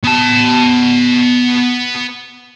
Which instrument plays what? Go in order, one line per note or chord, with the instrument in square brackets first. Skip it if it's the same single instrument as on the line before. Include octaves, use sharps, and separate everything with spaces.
[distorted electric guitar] B3 A5